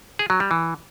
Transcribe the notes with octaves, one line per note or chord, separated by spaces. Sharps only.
G#4
F#3
G3
E3